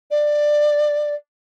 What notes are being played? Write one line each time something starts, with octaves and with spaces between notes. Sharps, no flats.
D5